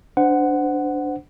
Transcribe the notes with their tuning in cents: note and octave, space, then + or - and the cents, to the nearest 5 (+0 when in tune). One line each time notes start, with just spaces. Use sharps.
D4 +0 C5 -25 F#5 +5